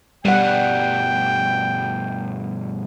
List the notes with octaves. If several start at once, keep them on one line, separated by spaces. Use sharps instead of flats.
G2 B2 G3 F#5 G5